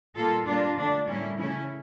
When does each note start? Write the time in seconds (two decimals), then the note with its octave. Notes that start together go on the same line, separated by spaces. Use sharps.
0.16 A#2 G3 A#3 F4 A4
0.46 A#2 G3 A#3 D4 F4
0.77 D3 A3 D4
1.08 A2 G3 A#3 C#4 E4
1.39 C#3 E3 A3 C#4 E4